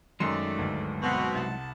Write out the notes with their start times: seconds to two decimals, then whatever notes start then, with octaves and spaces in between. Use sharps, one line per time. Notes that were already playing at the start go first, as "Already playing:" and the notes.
0.20 F#2 D#3 F#3 G#3 A3 D#4 D5 C6
0.58 G1 D2 D#3
1.02 B2 C4 F#5
1.35 C2 F#5 A5